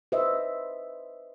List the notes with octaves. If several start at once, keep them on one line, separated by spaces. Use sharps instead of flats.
B4 C5 D#5 E5